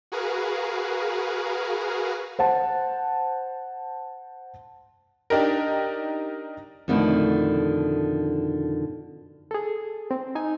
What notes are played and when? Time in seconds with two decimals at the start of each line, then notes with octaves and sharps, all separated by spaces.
0.12 F#4 G#4 A#4 B4 F5
2.39 C5 F#5 A5
5.30 D4 D#4 G4 A#4
6.88 F2 B2 D3 D#3 A3 E4
9.51 G#4 A4
10.11 C4
10.35 D#4 G#5